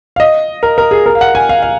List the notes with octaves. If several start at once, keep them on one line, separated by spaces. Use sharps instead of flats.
F5
D#5
A#4
A#4
G#4
A#4
F5
F#5
G#5
F5
F5